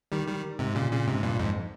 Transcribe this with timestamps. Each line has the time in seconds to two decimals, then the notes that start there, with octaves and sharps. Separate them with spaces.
0.12 D#3 G3
0.28 D#3 G3
0.59 G#2 C3
0.75 A#2 C#3
0.92 A#2 C#3
1.07 G#2 C3
1.23 G2 A#2
1.38 F2 G#2